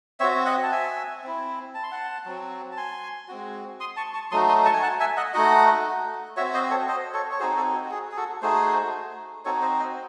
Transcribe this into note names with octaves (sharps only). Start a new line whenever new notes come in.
C4 F#4 C#5 E5
D#5 F#5
A5
E5 G#5
C4 E4
A5
C6
F#5 A5
F#3 C4 F#4
A5
G#5 C6
G#3 C4 F#4
C6 D#6
A5 C#6
A5 C#6
F#3 A3 D#4 F#4 C6 D#6
C6 D#6
A5 C#6
G#5
F#5 A5
E5 G#5
D#5 F#5
A3 D#4 F#4 D#5 F#5
C4 F#4 C#5 E5
C5 D#5
A4 C#5
C5 D#5
A4 C#5
C#5
C4 D#4 F#4 G#4 C5
F#4 A4
F#4
F#4
G#4
G#4
F#4 A4
A3 D#4 F#4 G#4 C5
C4 D#4 F#4 A4 C#5
C5 D#5
C5 D#5